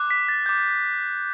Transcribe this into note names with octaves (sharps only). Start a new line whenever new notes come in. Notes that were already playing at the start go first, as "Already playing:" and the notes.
Already playing: D6 F#6
B6
A6
D6 G6